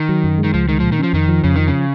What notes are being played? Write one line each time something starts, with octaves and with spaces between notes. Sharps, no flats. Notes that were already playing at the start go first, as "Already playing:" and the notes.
Already playing: D#3
F#3
F#2
G#3
D#3
C#2 F3
D#3 G#3
A#2 F3
D#3
F3 C#4
F2 D#3
F3
F2 C#3
D#3 F3
C#3